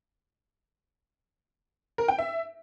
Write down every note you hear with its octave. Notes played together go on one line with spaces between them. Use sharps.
A#4
G5
E5